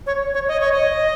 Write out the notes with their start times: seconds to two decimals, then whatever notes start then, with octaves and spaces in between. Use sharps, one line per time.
0.07 C#5
0.34 C#5
0.48 D#5
0.60 C#5
0.72 D#5